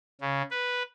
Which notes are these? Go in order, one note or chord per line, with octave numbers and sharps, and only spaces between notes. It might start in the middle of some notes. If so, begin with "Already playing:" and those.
C#3
B4